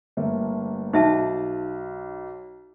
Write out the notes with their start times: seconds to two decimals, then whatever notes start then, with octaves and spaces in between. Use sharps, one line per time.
0.17 G1 A3 A#3
0.93 B1 D#4 E5 A5